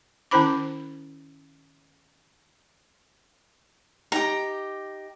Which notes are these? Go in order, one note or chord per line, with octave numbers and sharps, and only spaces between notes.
D#3 C#4 E4 C5 B5 D6
D#4 G4 A#5